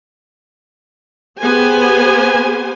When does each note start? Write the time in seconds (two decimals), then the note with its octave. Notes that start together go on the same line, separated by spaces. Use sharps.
1.40 B3 G4 G#4 C5 G#5